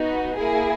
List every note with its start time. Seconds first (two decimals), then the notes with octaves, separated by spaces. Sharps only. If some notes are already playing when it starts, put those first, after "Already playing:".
Already playing: B3 D#4 F#4
0.38 A#3 E4 G#4